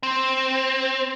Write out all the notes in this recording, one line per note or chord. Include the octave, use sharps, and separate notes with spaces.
C4